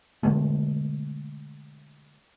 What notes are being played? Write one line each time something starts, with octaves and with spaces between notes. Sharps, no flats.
B2 D3 G#3 A3